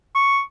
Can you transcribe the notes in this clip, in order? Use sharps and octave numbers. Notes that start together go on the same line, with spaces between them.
C#6